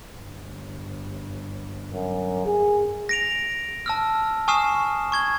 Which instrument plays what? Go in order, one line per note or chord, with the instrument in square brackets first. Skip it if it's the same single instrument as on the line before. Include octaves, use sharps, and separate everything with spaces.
[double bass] G1
[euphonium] F#2
G#4
[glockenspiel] A#6 D7 F7
A5 E6 F6
G#5 C#6 D#6 F6 C7 E7
C#6 G#6 G7